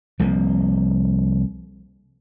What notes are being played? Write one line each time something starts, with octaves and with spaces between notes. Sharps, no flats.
C2 F3 A#3